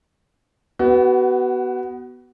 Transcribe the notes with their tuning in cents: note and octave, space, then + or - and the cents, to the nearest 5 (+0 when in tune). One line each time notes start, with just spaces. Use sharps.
B3 +0 F#4 +30